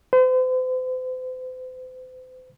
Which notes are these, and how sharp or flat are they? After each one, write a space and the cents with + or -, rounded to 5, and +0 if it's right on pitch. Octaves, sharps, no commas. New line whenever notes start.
C5 -40